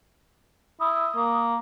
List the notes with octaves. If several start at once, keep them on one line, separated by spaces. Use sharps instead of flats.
E4 D#6
A#3